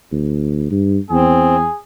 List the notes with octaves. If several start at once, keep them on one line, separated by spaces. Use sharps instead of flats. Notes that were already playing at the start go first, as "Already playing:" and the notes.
D2
G2
E2 C4 G#4